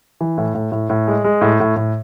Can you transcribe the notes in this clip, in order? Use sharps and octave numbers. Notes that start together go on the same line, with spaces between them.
E3
A2
A2
A2
A2
G#3
G#3
A2
A2
A2